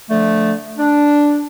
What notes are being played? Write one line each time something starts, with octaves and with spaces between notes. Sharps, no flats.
D3 F3 A3
D4